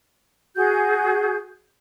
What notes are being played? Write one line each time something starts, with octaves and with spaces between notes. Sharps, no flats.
F#4 G#4 G6